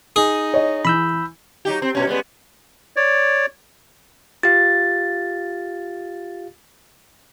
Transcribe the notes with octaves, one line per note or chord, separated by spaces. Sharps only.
D#4 G#4
C#5 D#5
E3 B5 E6 G6
F#3 D#4 G4
C4
G2 B2 C#4
G3 G#3 B3
C#5 D5
F4 G4 F5 A6